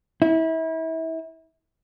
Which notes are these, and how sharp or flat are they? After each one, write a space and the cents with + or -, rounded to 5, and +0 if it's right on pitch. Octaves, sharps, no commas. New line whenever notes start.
E4 -30